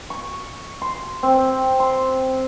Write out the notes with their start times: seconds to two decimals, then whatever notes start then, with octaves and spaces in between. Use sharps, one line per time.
0.10 C#6
0.82 C6
1.23 C4
1.80 C6